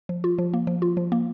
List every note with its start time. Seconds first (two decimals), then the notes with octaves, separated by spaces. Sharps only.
0.09 F3
0.24 F4
0.38 F3
0.54 A#3
0.67 F3
0.82 F4
0.97 F3
1.12 A#3